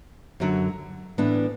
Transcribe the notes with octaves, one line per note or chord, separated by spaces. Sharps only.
F#2 D3 F#3
A2 E3 B3 D4